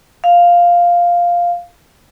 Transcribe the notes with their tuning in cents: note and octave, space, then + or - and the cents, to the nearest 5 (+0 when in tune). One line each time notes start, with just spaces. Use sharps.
F5 +0